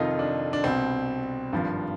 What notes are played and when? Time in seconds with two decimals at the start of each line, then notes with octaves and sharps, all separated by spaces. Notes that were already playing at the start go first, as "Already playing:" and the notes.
Already playing: F1 F2 D#3 D#4 F4
0.19 D4
0.53 D4
0.64 C2 B2 C4
1.53 G#1 G2 F3